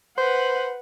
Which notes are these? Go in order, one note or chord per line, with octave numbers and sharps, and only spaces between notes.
B4 C5 F#5